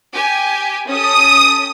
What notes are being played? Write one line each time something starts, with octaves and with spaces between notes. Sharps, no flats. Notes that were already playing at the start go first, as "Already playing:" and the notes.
G4 G#5
C#4 G4 A4 D#6